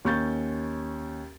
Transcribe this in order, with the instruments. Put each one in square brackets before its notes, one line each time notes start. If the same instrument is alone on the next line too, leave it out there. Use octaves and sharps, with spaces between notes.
[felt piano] D#2 C#4 C#6 G6 A6